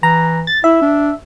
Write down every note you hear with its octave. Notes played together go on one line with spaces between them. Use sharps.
E3 A#5
A6
E4 E5
D4